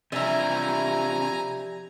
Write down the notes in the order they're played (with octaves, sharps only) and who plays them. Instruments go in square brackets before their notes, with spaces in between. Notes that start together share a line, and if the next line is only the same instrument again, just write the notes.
[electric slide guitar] C3 D4 [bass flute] F3 [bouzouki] G3 E4 [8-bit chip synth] G#5 A#5